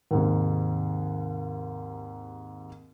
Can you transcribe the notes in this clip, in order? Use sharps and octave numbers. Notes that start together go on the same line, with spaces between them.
D#2 G#2 C3